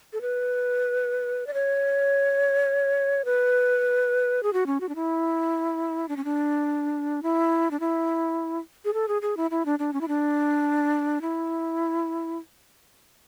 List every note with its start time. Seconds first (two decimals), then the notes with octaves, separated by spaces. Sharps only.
0.13 A4
0.21 B4
1.47 D5
1.54 C#5
3.25 B4
4.43 G#4
4.53 F#4
4.66 C#4
4.81 F#4
4.89 D4
4.95 E4
6.09 D4
6.17 C#4
6.24 D4
7.23 E4
7.71 D4
7.80 E4
8.85 G#4
8.94 A4
9.08 G#4
9.22 G#4
9.37 E4
9.51 E4
9.66 D4
9.79 D4
9.93 C#4
10.01 E4
10.08 D4
11.22 E4